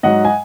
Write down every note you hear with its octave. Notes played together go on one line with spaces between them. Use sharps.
G#2 F#3 D#5 F#5
G#5